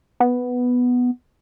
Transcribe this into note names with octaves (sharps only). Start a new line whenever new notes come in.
B3